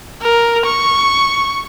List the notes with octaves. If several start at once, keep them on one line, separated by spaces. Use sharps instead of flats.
A#4
C#6